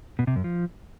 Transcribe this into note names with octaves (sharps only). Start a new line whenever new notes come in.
B2
C3
F#2
F3